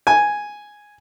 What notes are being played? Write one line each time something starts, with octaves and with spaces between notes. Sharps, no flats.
G#5